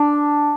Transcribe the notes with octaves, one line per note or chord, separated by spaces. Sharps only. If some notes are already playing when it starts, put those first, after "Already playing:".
Already playing: D4